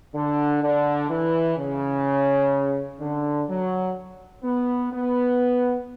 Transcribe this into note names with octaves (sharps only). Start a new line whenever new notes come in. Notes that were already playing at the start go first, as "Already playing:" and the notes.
D3
D3
E3
C#3
D3
F#3
B3
B3